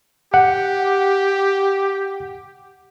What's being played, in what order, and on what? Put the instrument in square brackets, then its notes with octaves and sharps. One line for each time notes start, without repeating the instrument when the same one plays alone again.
[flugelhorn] G4 [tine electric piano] F#5